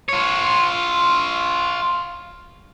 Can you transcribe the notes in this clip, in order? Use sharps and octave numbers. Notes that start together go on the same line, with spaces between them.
F4 C#5